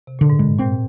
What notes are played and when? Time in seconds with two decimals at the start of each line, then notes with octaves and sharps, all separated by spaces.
0.07 C3
0.19 A#2 D3
0.30 G#2
0.39 G2 G#3
0.59 A#2 C4